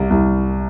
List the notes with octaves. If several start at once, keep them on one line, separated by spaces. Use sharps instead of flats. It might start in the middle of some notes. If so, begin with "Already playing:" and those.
Already playing: C2
C2